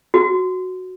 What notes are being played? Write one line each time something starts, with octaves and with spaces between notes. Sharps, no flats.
F#4